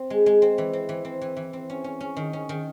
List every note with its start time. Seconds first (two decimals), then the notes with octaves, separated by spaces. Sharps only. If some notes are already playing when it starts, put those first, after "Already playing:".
Already playing: C4
0.10 G#3
0.26 G#3
0.42 C4
0.58 E3
0.73 C4
0.89 E3
1.05 C4
1.21 E3
1.37 E3
1.53 C4
1.70 C#4
1.84 C#4
2.00 C#4
2.17 D#3
2.33 C#4
2.49 D#3